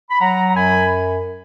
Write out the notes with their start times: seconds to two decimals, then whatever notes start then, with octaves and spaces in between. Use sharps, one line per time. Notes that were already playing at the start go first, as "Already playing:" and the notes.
0.10 B5
0.20 F#3 F#5 A#5
0.49 A#5
0.55 F#2 G#5 B5